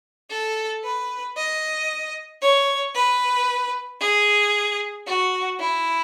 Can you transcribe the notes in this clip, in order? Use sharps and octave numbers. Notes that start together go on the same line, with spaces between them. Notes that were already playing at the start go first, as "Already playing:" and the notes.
A4
B4
D#5
C#5
B4
G#4
F#4
E4